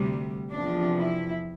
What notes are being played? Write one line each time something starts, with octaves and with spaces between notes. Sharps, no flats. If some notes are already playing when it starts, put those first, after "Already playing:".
Already playing: D2 C3 G3
E2 C3 F3 D4
E4